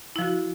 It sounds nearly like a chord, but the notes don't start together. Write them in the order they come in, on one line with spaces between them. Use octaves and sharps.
E4 F3 F#4